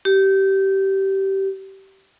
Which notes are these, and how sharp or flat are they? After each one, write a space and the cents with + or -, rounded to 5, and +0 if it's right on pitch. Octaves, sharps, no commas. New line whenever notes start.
G4 -20